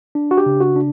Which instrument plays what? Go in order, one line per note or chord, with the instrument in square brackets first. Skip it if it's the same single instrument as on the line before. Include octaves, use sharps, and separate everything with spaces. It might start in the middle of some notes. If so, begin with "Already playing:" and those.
[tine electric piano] D4
F#4
G4
C#3
F#4
D4